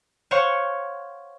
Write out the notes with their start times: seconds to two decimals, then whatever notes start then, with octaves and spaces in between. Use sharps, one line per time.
0.31 C5 C#5 F5 F#5 C6 C#6